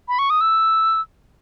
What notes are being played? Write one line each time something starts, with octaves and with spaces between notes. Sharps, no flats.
B5
C#6
D#6
E6